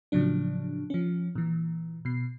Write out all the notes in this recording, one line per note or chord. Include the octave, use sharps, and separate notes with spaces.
A2 C#3 F3 F#3 D4
F3 C#4
A#2 E3
B2 C7